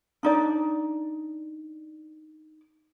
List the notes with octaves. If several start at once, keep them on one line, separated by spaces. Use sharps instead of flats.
D4 D#4 D5